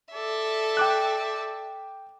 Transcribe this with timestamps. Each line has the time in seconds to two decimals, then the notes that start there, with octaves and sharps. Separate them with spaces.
0.13 A4 D5 E5
0.77 G5 D6 F#6